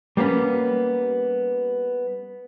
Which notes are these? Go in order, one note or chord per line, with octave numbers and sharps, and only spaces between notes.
G3 A#3 B3 C#4